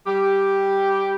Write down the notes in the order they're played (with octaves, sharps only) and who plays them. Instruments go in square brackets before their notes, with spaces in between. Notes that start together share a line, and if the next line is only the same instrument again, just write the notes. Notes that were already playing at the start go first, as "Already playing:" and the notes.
[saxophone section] G3 G4